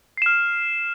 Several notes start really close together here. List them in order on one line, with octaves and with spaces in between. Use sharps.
C7 E7 F6